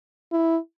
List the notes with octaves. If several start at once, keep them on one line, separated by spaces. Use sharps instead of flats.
E4